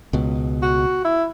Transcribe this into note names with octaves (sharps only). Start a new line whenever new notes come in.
C#2 B2
F#4
E4